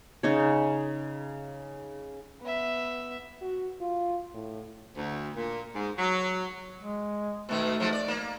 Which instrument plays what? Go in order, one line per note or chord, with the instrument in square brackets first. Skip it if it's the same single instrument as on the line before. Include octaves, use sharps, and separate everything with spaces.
[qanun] C#3 D#4 C#5
[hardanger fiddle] B3 E5
[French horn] F#4
F4
A2
[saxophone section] D2
A#2
G#2
F#3
[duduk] G#3
[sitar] B2 D#3 [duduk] A3
[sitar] G#2 F3 F#3
D5
A#3